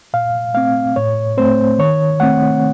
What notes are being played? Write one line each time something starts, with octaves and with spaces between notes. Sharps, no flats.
A#2 F5
A3 C4 F5
A2 C#5
A3 C4 C5
D#3 C#5
A3 C4 F#5